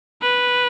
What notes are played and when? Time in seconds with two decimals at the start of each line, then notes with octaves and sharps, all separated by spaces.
0.22 B4